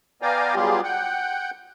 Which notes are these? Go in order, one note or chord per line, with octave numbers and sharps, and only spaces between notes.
B3 D5 F5 G5 G#5 A#5
F#3 G3 B3 F4 G4 G#4
F#5 G5